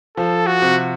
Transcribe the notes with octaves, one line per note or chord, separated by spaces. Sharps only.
F3 A4
F#4
C3